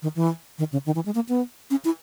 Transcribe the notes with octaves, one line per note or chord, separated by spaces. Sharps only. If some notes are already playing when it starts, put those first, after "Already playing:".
D#3
E3
D#3
C#3
D#3
E3
G#3
A#3
B3
C#4
E4